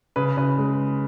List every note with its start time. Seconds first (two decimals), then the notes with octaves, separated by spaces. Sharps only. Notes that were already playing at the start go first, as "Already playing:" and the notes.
0.16 C#3 B4
0.37 C#3 B4
0.58 G#3